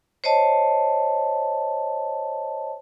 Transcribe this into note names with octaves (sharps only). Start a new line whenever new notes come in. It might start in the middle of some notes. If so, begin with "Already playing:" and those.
C5 C#5 D#5 A5